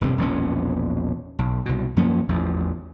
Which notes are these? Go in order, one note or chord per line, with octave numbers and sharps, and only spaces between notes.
E1 G2 C3
E1 A#1 E3 C#4
B1
C2 B2
F#2 F3 A#3 C#4
A1 E2 F3